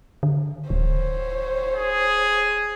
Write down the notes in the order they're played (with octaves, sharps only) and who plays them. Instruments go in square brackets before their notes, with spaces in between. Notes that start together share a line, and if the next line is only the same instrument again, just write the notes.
[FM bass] D3
[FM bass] D1 [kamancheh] C5 C#5
[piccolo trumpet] G#4